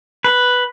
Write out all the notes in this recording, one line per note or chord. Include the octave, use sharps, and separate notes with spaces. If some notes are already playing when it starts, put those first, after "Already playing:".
B4